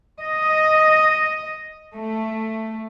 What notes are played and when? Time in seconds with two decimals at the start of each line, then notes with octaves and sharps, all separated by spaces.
0.22 D#5
1.94 A3